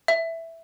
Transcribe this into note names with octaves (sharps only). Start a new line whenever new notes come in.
E5